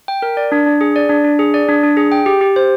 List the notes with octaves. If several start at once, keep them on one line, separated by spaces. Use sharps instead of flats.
G5
A#4
D5
D4
D4
G#4
D5
D4
D4
G#4
D5
D4
D4
G#4
G5
G4
G4
C5